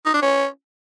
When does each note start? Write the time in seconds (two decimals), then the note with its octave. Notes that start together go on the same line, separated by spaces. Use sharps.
0.06 D#4
0.14 D4
0.22 C#4